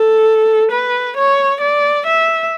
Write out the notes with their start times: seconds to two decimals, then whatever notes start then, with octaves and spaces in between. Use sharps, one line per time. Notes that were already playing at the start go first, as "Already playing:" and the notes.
Already playing: A4
0.71 B4
1.17 C#5
1.61 D5
2.06 E5